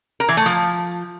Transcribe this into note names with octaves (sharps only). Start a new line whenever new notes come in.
A#4
E3
A3
F3